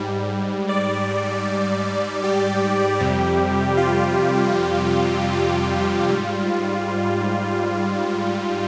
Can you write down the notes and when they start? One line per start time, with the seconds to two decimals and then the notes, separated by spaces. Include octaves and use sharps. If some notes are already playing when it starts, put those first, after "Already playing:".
Already playing: G#2 G3
0.69 D5
2.24 G4
3.00 F2 C3 G3
3.77 F4
5.33 F4
6.10 G#2 G3